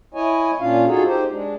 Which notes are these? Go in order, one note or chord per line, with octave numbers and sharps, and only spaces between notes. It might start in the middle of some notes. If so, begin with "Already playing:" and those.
E4 C#5 D#5 G#5
A#2 C#4 D4 F4 F5
D#4 F4 F#4 G#4 A4
D#4 G4 C5
G#3 D4